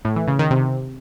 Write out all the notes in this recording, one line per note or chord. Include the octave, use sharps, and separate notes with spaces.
A2
E3
C#3
D#3
C3